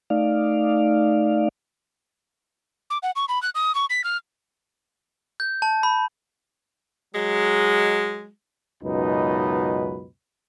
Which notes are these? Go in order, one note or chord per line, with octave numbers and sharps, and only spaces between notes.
A3 D#4 D5 F5
D6
F#5
C#6
B5
F#6
D#6
C#6
B6
F6
G6
A5
B5
F#3 G#3
C#2 F#2 B2 D#4 B4